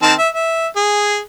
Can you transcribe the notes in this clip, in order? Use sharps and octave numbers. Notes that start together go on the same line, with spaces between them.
D#3 C4 A5
E5
E5
G#4